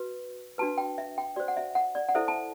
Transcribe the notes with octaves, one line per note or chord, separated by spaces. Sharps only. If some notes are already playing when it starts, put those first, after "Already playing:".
Already playing: F#4 B4
D4 F#4 B4 A5
G5
E5
G5
F#4 C5 D5
F#5
E5
F#5
D5
F#5
E4 A4 C5 E5
A5